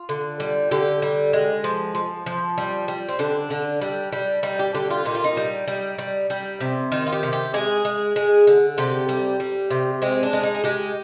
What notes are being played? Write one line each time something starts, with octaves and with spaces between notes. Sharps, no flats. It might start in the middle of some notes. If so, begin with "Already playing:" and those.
Already playing: F4
D3
G3
D3 G4
G3
G#3
F3
F3
F3
G3
G3
C4
D3 D4
D3
G3
G3
G3 D#4
G4
D3 G4
F4
A#2 D#4
F4
D#4
G3
G3
G3
G3
C3
D#3 F4
F4
G4
C3
G4
G#3 G#4
G#3
G#3
D3
C3 G4
G3
G3
C3
G#3 C4
D4
G#3
D#4
G#4
G#3 G4